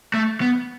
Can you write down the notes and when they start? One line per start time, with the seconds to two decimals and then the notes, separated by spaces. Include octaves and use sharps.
0.14 A3
0.41 B3